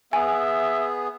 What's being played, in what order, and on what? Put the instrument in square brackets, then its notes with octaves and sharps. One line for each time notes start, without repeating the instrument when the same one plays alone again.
[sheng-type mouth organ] B3 G#4 [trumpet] E5 [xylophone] G#5